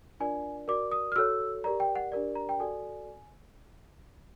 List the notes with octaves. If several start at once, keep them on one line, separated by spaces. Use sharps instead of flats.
D4 F4 A#4 D5 G#5
F#4 A#4 D5 D6
D#6
F6
F#4 A4 C#5 E6
G4 A#4 D5 A#5
G5
F#5
D4 G4 A#4 D5
A#5
G5
F#4 A4 D5 G#5